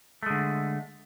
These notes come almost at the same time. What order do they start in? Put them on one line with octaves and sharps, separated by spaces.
A3 G#3 D3